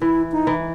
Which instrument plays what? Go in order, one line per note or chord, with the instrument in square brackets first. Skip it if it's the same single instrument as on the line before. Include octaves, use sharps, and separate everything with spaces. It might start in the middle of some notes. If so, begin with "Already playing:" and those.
[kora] E3 [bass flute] E4
[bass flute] D#4
[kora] E3